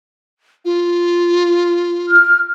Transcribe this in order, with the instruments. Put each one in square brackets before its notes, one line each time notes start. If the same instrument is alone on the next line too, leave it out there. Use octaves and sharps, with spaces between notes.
[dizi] F4
[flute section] F6